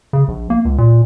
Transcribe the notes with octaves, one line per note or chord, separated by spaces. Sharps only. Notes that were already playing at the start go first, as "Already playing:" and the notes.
C#3
A#1
A#3
C#2
A#2